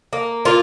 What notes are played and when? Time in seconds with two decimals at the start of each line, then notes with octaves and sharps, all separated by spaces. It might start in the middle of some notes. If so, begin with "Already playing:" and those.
0.13 A#3
0.45 A#2 F4